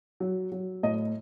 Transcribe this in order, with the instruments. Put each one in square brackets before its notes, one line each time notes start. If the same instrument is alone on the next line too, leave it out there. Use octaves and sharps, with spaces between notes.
[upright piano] F#3
F#3
A2 D#5